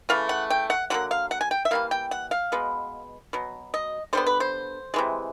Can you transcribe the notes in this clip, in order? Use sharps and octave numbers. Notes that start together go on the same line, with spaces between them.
C#3 E3 A3 F5
F#5
G5
F#5
D3 F#3 A#3 F#5
F5
F#5
G#5
G5
E5
E3 G3 A#3 F5
G5
F#5
F5
B2 G#3 B3
B2 F#3
D#5
D3 G3 B3 C5
B4
C5
C3 E3 G#3